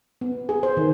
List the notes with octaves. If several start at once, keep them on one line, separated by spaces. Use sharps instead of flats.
B3
G#4
C5
D#3